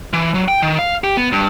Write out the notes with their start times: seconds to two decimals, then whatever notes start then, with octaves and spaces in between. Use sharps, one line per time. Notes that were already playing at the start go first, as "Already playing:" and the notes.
0.13 E3
0.34 F#3
0.48 G5
0.62 D#3
0.79 F5
1.04 G4
1.17 B3
1.32 G2